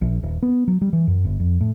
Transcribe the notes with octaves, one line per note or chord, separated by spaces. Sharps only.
A#1
D#1
B3
F#3
G3
E3
F#2
G1
F2
A2